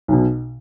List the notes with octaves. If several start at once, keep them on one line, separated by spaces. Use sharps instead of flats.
B1 B2